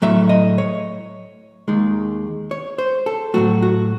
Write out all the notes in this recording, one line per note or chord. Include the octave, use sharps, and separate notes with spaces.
A2 F#3 A3 E5
D#5
C#5
D#2 D#3 G#3
C#5
C5
A4
A2 F#3 A3 F#4
F#4